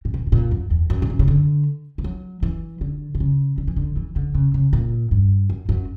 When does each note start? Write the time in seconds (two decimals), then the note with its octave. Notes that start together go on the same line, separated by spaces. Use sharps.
0.05 A#2
0.14 B2
0.27 G2
0.32 A#2
0.51 F#2
0.71 E2
0.90 F#2
1.02 A#2
1.10 B2
1.19 C#3
1.28 D3
1.98 E3
2.04 F#3
2.43 E3
2.81 D3
3.15 B2
3.20 C#3
3.58 D3
3.68 E3
3.76 D3
3.97 E3
4.16 D3
4.35 C#3
4.54 C#3
4.73 A#2
5.11 G2
5.50 F#2
5.69 F#2